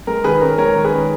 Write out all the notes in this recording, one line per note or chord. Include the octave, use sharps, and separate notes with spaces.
G#3 A#4
D#3 G#4 B4
C#4 A#4
G#3 A#4 C#5
D#3
G#4 B4
C#4